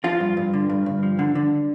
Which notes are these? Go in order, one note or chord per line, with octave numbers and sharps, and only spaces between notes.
F3 F4
G2
G2
D3
G2
G2
F3
D3
D3